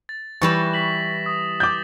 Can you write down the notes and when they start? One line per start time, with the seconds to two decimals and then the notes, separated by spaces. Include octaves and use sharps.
0.09 A6
0.42 E3 G3 B4 C#6 A6 A#6 E7
0.74 B6 F#7
1.26 D#6
1.60 D6 G6 A6